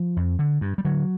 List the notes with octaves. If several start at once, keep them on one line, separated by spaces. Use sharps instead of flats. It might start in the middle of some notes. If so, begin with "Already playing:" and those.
Already playing: F3
F2
D3
G2
G3
D3 F#3